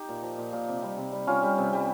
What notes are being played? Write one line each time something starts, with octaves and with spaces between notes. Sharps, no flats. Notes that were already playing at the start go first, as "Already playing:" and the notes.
Already playing: D#4 G4
A#2
F3
A#2
A#2
C3
G3
C3
G3
G3 C#4 F4
G3
C3
G3